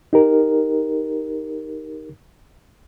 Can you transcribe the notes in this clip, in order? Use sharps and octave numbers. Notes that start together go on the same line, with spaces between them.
D#4 G4 A#4